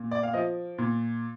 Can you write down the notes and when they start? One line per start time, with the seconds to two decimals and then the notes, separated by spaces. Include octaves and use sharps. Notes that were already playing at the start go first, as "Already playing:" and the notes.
Already playing: A#2
0.11 D5
0.23 F5
0.33 F3 D#5
0.78 A#2